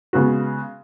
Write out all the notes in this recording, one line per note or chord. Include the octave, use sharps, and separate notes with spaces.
C#3 G#3 B3 F#4